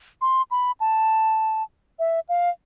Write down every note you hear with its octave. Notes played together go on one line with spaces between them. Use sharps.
C6
B5
A5
E5
F5